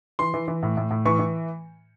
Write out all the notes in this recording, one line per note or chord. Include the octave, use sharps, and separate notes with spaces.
E3 C6
E3
E3
A2
A2
A2
E3 C#6
E3